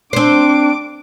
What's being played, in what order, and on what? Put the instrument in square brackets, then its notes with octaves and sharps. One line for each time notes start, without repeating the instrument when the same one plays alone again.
[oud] C4 C5 [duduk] D4 [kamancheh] D6